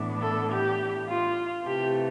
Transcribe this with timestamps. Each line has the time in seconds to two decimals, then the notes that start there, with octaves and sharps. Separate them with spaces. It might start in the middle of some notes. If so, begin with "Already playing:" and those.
Already playing: A2 E3 B3 D4
0.21 A4
0.51 G4
1.09 F4
1.66 C3 E3 A3 G4